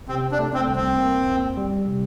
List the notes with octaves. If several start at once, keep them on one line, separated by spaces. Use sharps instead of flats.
C3 C4
D4
A3
C4
C2
C4
A#3
F2
G3
C3